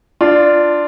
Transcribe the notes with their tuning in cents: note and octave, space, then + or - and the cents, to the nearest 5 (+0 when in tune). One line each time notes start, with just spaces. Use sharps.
D4 +5 F4 -5